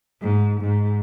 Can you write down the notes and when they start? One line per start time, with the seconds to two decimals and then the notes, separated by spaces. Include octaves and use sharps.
0.21 G#2
0.61 G#2